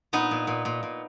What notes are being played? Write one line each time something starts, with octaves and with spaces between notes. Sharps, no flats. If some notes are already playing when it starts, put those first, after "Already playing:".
A#2 B3 D#4
A#2
A#2
A#2
A#2